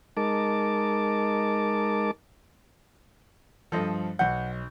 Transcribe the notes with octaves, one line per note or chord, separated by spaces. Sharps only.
G#3 D#4 A#4 A5 D6
G2 F3 A4 C5 D#5
B1 F#5 G6